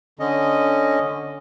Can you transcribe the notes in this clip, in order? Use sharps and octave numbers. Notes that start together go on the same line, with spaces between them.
D3 C#4 D#5